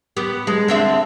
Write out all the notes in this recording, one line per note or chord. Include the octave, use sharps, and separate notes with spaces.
B3 G4
G#3
D3 C4 E5